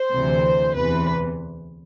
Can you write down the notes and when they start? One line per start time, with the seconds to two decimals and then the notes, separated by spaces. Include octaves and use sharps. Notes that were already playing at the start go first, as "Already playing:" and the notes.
Already playing: C5
0.11 D2 C3 E3
0.74 E2 C3 E3 B4